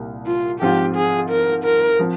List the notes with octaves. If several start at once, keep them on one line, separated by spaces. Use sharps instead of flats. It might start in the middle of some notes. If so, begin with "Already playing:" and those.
Already playing: C2 A#2
F4
G#2 F3 C4 F4 G4
G#4
A#4
A#4
F3 C4